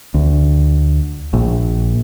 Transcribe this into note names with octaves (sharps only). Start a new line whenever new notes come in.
D2
A#1